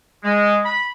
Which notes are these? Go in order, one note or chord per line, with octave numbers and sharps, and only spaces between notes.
G#3
B5